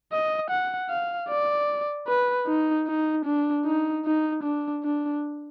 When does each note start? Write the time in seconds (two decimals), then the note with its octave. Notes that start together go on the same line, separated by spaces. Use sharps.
0.12 D#5
0.50 F#5
0.90 F5
1.29 D5
2.07 B4
2.47 D#4
2.87 D#4
3.25 D4
3.65 D#4
4.05 D#4
4.43 D4
4.83 D4